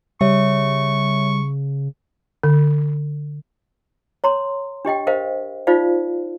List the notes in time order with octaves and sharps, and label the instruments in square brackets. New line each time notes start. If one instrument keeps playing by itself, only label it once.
[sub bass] C#3 [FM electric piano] G3 [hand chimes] C#5 E5 [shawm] C#6
[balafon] D3
[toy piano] C#5 A#5 C6
D4 G4 D#5 G5
A#4 C5 D#5 F5
D#4 F4 C5 D5 F5